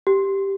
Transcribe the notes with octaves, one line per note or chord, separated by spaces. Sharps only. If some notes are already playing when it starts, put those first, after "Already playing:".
G4